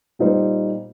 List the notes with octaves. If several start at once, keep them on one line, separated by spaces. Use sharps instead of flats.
A#2 G3 D#4 C5